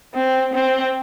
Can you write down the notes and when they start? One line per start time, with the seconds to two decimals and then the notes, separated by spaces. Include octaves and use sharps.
0.15 C4
0.54 C4